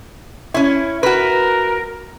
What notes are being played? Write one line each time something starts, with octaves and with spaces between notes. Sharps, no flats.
C#4 E4
F#4 A#4 B4